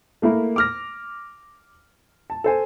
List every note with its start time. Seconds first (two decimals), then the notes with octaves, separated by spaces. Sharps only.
0.22 A3 A#3 E4 A#4
0.56 D6 F6 A#6
2.30 A5
2.44 A4 C5 G#5